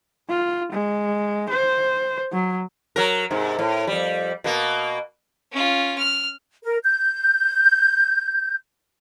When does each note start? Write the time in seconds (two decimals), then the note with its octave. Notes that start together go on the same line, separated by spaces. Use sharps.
0.29 F4
0.72 G#3
1.49 C5
2.33 F#3
2.96 F#3 A#4
3.30 G#2 C3
3.59 A2
3.87 F2 G3
4.44 B2 A#3
5.52 C#4 F4
5.98 F6
6.63 A#4
6.84 G6